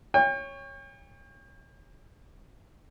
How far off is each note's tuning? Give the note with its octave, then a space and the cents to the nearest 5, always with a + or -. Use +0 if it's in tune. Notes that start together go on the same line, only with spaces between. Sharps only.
C#5 +0 G5 +40